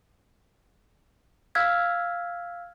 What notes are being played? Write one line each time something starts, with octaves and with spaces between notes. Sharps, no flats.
F5 E6 F6 G#6 B6